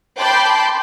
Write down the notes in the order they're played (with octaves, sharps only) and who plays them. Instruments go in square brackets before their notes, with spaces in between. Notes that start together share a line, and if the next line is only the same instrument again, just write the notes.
[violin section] G5 A5 B5 C6 D6 G6